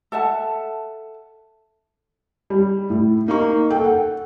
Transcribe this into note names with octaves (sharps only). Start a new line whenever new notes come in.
A4 E5 F#5 A5
G3
A2
A#3 D#4 C#6
A4 G5
F#5